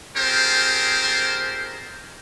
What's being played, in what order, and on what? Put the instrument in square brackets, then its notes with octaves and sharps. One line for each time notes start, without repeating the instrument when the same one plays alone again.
[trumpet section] C4 F4 G4 G#4 A#4 C5